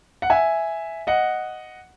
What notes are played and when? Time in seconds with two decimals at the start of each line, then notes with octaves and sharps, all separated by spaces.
0.22 F#5
0.30 E5 G#5
1.07 D#5 F#5